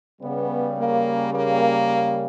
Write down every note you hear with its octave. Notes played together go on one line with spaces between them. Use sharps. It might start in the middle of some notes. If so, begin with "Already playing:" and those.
C#3 G3 B3
A#3
A#3